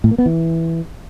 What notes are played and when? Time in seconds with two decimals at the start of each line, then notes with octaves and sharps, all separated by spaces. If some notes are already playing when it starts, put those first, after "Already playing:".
0.04 A2
0.11 A#3
0.18 B3
0.26 E3